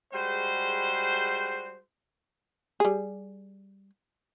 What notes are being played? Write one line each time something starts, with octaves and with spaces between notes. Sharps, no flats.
G3 G#3 F#4 G#4 C5
G3 G#4